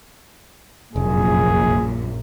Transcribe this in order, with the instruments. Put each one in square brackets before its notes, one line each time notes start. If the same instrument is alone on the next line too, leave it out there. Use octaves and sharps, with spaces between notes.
[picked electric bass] F1 [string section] A#1 F#2 A#2 [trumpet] G#4